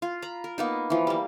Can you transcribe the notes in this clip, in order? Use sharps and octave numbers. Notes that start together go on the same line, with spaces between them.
F4
A#5 B5
A#4
A#3 B3 D#4
E3 F3
G3 A#3